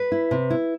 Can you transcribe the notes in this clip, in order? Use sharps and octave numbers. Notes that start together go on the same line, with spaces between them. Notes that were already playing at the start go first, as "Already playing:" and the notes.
Already playing: B4
E4
C3
E4